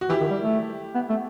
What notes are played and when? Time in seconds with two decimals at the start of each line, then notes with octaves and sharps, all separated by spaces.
0.01 F#4
0.09 E3 E4 G4
0.20 D#3
0.30 G3
0.42 A3
0.95 B3
1.10 A3